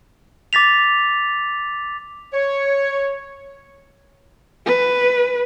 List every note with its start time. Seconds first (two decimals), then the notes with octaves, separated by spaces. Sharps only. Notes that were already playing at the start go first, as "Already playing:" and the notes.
0.53 D6 A6 B6 F7
2.34 C#5
4.66 B4